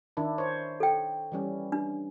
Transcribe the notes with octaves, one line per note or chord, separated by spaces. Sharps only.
D#3 D4 E4
C5 C#5
A4 G5
E3 G3 C#4
D4